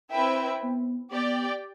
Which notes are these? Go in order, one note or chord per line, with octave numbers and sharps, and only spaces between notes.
C4 E4 B4 E5 G5
B3
B3 G4 D5 G5